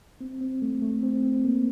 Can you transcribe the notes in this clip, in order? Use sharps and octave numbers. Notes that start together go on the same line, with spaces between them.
C4
C4
A3
A3
C4
C4
A#3